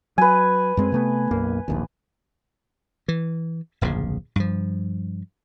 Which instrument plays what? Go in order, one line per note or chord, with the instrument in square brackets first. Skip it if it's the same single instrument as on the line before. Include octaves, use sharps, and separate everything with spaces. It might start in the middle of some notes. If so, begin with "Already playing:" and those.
[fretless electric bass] F#3 [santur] B4 G#5
[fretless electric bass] F#2 G#3 C4
C3 A3 B3
B1 F#2 A#3
D1 A#1 D#2
[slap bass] E3
D1 A#1 F2 C#3
G2 F3